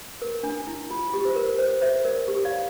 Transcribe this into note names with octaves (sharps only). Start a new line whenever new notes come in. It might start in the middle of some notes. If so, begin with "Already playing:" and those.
A#4
D4
E4
F4
G4
C5
A#4
C5
C5 E5
A#4 D5
G4
D5 F5